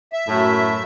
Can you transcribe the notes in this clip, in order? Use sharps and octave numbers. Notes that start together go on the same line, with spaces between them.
E5
F#2 A2